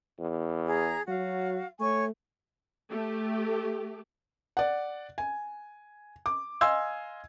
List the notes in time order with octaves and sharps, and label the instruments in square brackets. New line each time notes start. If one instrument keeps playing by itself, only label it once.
[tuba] E2
[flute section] G#4 A#5
[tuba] F#3 [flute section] F#4 F5
[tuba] A3 [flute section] C#5 G#5 C#6
[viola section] A3 G4
[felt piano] D5 F#5
G#5
D6
D#5 F5 G#5 C6 E6 G#6